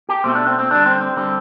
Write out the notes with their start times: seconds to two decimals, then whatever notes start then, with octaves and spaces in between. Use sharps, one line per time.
0.09 G4
0.24 B2 A3 C4
0.35 D4
0.47 C4
0.58 C4
0.70 D3 G3 D4
0.86 C4
1.01 C4
1.16 D3 G3 C4